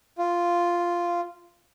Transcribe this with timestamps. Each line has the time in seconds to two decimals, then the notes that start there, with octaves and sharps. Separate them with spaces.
0.18 F4